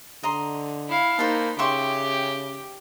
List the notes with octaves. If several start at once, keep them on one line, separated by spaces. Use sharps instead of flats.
D3 D#5 A#5 C6
E4 F5
A#3 D#4 B4 C5 A5
C#3 G4 E5 G5 C6 C#6